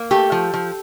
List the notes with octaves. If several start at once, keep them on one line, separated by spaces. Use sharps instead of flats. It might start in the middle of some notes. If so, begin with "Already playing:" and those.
Already playing: A#3
A3 G4 A4
F3
F3